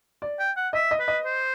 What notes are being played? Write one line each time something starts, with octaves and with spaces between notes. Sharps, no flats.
D5
G5
F#5
D#5 E5
D#5
B4
D#5
C5